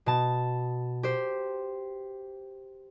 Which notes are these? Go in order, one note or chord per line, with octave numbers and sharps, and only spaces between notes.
B2 A5
G4 C5